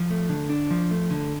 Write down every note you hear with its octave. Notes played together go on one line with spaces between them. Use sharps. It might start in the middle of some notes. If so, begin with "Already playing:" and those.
Already playing: F3
A3
D3
D4
F3
A3
D3